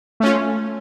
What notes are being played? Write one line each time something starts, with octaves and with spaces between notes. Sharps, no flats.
A3 C#4 F4